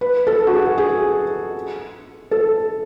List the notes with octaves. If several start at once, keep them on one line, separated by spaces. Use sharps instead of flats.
B4
A4
F#4
G#4
G#4
A4